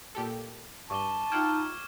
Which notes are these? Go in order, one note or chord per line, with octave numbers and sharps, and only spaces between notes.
A#2 G4 A4
G2 A5 C#6 D6 G7
D#4 F4 F#5 G5 F6 G#6 E7